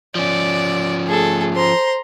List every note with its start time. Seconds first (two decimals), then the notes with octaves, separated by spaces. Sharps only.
0.15 F3 C#4 D5
1.08 A3 G#4 A4
1.56 C5 A#5 C6